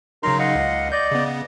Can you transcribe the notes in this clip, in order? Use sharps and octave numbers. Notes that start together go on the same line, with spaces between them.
C#3 F#3 D#4 A#4 A#5 C6
D#5 F5 F#5
C#2
D5 D#5 G6
C#3 B3